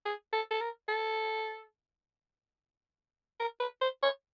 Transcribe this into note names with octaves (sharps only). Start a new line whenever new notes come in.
G#4
A4
A4
A#4
A4
A#4
B4
C5
C#5